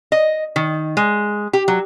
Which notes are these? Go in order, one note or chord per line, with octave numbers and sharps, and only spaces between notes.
D#5
D#3
G#3
G4
F#3